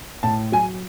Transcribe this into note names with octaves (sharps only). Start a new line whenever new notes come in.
A2 A5
F#3 G#5